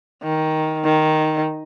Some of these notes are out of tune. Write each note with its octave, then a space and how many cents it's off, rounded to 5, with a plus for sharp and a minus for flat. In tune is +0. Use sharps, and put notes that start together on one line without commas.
D#3 +10
D#3 +0